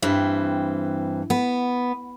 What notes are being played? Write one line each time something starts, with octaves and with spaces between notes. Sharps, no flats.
G2 E3 C4
B3